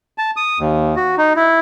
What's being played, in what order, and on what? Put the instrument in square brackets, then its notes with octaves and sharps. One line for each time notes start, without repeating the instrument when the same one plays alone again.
[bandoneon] A5
D#6
D#2
F#4
D#4
E4